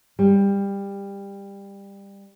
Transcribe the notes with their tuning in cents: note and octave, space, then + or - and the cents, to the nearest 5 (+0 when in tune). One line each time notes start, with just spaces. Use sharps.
G3 +20